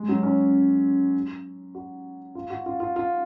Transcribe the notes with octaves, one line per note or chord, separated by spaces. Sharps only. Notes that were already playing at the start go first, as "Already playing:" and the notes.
Already playing: G#3
F#3
C#4
F#4
F4
F#4
F4
F4
F4